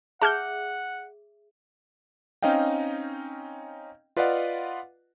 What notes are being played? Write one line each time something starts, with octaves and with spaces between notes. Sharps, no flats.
G#4 E5 F#5 A5 F6 G6
C4 C#4 D#4 D#5 F5 G5
F4 B4 D5 D#5 F5 F#5